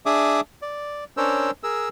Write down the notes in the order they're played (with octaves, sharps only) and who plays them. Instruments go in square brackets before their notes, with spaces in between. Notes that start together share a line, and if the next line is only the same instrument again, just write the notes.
[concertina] D4 G#4 E5 D6 D#6
D5
C#4 D4 A#4 C5 C#5 E6
G#4 A#4 E6